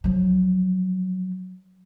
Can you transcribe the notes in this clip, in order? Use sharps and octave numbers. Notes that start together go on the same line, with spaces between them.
F3 F#3